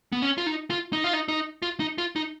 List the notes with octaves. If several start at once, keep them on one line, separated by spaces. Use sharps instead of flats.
B3
C#4
F4
D#4
F4
D#4
F4
D#4
D#4
F4
D#4
F4
D#4